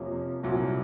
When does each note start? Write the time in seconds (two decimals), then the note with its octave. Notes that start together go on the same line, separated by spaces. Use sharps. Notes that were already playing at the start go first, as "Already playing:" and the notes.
Already playing: F2 C3 F3 A#3 C#4
0.43 C2 A#2 F#3